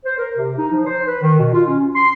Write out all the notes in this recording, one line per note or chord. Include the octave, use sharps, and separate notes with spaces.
C5
A#4
C3
D#4
F3
C5
B4
D#3
B2
F4
C#4
C6